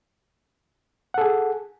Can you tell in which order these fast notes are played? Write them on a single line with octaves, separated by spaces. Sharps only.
F#5 A4 G#4